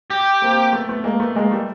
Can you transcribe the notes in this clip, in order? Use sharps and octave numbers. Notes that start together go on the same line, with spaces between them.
G4
A#3 C4
A3 B3
A3 B3
G#3 A#3
A3 B3
G#3 A#3
G3 A3